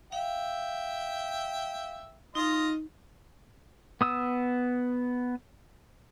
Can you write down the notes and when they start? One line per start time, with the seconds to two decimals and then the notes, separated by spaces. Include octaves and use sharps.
0.12 E5 F5 G5
2.35 D#4 F4 D#5 C6
4.01 B3 D#6 E6